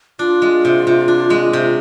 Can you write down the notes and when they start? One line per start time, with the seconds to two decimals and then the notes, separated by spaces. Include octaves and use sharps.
0.19 D4 F4
0.42 G#3
0.65 C3
0.87 C3
1.08 D4
1.30 G#3
1.53 C3